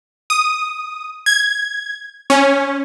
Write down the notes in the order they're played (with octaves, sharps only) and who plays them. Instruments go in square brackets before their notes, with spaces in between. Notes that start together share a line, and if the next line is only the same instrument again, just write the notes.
[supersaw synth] D#6
G#6
C#4